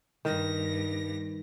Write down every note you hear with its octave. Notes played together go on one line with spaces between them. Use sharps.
G2 D#3 A#6